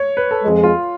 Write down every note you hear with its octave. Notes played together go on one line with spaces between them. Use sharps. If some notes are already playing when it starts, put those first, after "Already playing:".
Already playing: C#5
B4
A4
F2 F3 G#3
F4